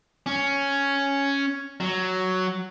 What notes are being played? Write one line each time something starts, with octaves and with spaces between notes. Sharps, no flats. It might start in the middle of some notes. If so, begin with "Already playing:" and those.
C#4
F#3